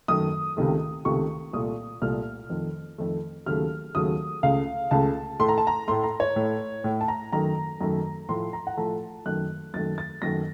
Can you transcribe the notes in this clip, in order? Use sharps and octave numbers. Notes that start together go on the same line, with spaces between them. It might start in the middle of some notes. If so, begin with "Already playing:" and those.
F#2 D#3 A3 D#6
C#2 C3 D#3 A3
C#2 C3 D#3 A3 C#6
C2 A#2 A3 D#6
C2 A#2 A3 F6
F2 D#3 A3
F2 D#3 A3
D#2 C#3 F#3 A3 F6
D#2 C#3 F#3 A3 D#6
C#2 C#3 A3 F5
C#2 C#3 A3 A5
A2 A3 C6
A#5
A5
A#5
A2 A3 C6
A#5
C#5
A2 A3
A2 A3
A5
A#5
F#2 D#3 A3 A#5
F#2 D#3 A3 A#5
A2 F3 A3 C6
A#5
F#5
A2 F3 A3 A5
F#2 D#3 A3 F#6
F#2 D#3 A3 A6
A6
F#2 D#3 F#3 A3 A#6